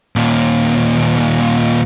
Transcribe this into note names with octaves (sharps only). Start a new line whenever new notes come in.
D#2 A#2